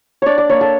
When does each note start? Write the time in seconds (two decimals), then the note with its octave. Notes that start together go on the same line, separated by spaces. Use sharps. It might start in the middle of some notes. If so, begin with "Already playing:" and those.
0.22 D4 C#5 D5
0.38 D5
0.49 A#3 C#5
0.61 A4